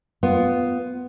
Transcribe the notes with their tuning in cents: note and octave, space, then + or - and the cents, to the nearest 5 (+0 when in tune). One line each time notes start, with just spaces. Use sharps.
B3 +10 F4 +0